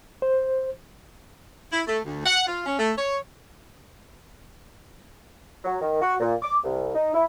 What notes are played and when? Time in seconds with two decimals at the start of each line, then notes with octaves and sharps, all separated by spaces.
0.22 C5
1.72 E4
1.87 A3
2.05 D2
2.26 F#5
2.47 F4
2.66 C#4
2.79 A3
2.98 C#5
5.64 F#3
5.81 D#3
6.02 F#4
6.20 A#2
6.42 D6
6.64 C2
6.95 D#4
7.14 E4